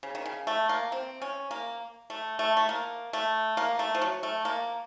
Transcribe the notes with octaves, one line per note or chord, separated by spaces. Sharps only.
C#3
D#3
C#3
A3
A#3
C4
C#4
A#3
A3
A3
A3
A#3
A3
A#3
A3
F3
F#3
A3
A#3